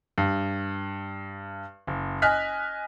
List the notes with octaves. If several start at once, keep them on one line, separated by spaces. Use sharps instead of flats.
G2
F#1
D#5 G#5 F6 F#6 B6